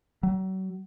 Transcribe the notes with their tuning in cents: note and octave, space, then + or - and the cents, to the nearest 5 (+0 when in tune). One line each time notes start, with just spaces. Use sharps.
F#3 +35